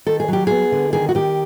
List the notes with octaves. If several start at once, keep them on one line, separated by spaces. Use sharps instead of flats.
D#3 A4
G#4
F#3 G4
B3 G#4
D3
D#3 G#4
F#4
D#3 G4